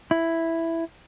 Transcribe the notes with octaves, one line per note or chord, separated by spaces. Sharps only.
E4